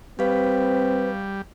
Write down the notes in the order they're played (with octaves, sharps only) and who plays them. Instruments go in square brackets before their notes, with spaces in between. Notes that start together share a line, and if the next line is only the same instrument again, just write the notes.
[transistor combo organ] G3 [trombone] C4 [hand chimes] G4 F5 [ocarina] B4